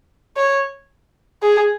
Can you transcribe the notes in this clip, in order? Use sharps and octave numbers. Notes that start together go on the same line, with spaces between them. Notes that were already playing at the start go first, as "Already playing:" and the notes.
C#5
G#4